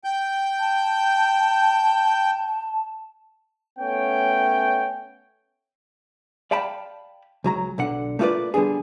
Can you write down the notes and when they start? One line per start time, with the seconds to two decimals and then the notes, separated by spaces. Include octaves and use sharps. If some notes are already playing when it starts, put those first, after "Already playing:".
0.04 G5 G6
0.59 A5
3.79 A3 B3 C#4 C#5 G5
6.51 D5 F5 G5 A5 B5
7.44 C#2 F#3 A#5
7.78 B1 D3 F#5
8.19 A3 A#3 F4 G4 B4 D5
8.54 D3 G3 B3 D4 G#4